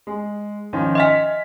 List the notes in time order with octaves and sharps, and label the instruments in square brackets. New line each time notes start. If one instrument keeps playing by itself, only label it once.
[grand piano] G#3
D#3 F3 C#4
[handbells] D#5 E5 G#5 [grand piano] C6 F6 B6